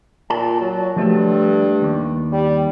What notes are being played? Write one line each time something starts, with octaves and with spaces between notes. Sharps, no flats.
A#2 A5
F#3
G2 F3 A3 A4
D#2
G3